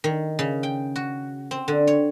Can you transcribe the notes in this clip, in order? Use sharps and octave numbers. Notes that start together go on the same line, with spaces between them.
D#3
C#3
G5
F#4
C4
D3
C#5